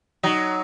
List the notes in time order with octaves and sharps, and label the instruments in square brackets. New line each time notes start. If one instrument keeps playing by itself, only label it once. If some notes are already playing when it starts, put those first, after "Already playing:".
[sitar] F#3 [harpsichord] D#4